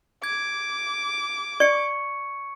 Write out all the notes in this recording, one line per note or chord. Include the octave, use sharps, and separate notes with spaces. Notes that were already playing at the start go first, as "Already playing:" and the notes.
D6 G#6
D5 C#6 C#7